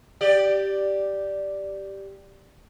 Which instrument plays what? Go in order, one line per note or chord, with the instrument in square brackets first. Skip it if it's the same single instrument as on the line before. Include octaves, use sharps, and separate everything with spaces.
[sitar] G4 D5